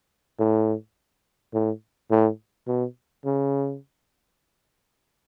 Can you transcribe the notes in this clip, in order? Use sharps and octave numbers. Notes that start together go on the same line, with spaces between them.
A2
A2
A2
B2
C#3